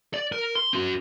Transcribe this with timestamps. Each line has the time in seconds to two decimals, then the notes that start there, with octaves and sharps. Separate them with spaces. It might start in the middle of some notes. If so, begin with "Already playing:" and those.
0.14 D5
0.32 A#4
0.56 C6
0.73 C#4 F#4